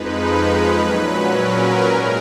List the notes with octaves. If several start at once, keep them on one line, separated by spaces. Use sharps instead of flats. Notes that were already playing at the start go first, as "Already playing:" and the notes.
Already playing: F2 F3 G#3 D#4 B4
A#2 F#3 C#4
A#4
G#2 F3 G#3 A#4